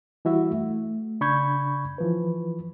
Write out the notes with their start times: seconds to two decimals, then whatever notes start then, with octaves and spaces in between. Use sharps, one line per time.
0.25 E3 G3 E4 F#4 E5
0.51 A3
1.21 C#3 D4 B5 C#6 G6 G#6
1.98 E3 F3 B4